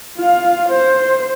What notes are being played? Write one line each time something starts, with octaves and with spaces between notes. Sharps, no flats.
F4 F5
C5